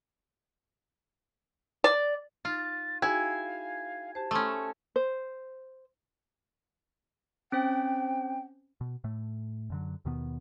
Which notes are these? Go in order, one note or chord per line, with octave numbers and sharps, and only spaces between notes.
D5
D#4 F4 A6
D#4 E4 F#4 G#4 F5 G#5
G4 C5 A5
A3 C#4 B5 C6 D#6
C5
C4 C#4 C5 G5
B2
A2 A3
F#2 D3 F#3
D#2 B2 D#3 B3